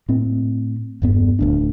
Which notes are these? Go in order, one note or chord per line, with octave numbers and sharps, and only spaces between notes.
A2 C4
E1 G2 B3
D1 D2 D4